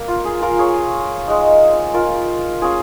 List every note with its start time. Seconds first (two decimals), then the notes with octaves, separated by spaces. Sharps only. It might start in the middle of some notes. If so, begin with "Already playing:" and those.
Already playing: A#3
0.08 F4
0.25 G#4
0.42 F4 A#4
0.59 G#4 C#5
1.27 G#3 D#4
1.94 F4 A#4
2.62 A#3 C#4 F4 G#4